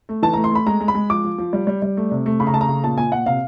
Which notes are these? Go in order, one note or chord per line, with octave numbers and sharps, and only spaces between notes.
A3
E3 A5
A3 A#5
C6
A3 B5
G#3 A#5
G#3
B5
G#3
F3 D6
F3
F3
G3
G3
G3
A3
C3
A3
C#3 B5
A#5
A3 A5
A#5
C#3
A#2 A5
A#2 G#5
A#2 F#5
C3 F5